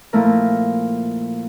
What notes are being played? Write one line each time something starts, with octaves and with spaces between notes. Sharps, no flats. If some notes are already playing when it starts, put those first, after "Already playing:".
A#2 F3 A3 E4 A#4